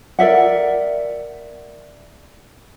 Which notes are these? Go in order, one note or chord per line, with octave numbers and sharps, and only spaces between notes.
A#4 D5 E5 F#5